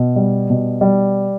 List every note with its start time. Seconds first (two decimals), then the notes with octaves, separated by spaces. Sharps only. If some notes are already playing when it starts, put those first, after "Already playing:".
Already playing: B2
0.16 G3
0.50 B2
0.81 G3